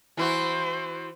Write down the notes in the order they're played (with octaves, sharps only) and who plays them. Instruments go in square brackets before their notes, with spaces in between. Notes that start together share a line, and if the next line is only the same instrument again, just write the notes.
[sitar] E3 E4 F#4 [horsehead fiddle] C5